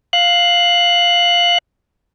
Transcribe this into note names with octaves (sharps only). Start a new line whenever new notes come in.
F5 F#6